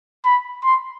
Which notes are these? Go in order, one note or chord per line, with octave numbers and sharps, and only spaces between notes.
B5
C6